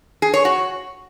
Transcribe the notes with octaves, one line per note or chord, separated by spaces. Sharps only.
G#4
C#5
F#4